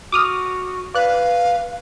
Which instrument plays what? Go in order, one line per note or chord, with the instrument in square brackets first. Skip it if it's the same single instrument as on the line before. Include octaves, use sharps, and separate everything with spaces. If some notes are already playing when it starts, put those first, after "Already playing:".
[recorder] F#4 [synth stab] D6 D#6 F6
[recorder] B4 [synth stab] D5 F#6 [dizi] F5